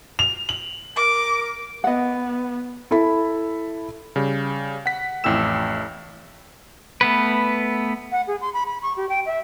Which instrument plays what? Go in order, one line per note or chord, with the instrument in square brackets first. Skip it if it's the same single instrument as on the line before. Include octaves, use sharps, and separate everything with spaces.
[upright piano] F7
F#7
[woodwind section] A#4 [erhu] D6
[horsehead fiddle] B3 [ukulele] D#5 F#5
[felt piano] E4 A4 E5 B5
[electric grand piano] C#3 G3
F#5 B6
A1 F2 E4 G5 E6 E7
[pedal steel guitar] A3 B3 B4
[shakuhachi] F#5
G#4
C6
B5
B5
C#6
G4
G5
E5